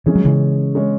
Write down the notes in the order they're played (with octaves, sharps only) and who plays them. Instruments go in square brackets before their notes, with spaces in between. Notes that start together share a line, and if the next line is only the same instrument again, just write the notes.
[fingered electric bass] E3 [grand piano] G#3 C#4 G#4 C#5
[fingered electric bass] F#3
C#3 E3
[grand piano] G#3 C#4 G#4 C#5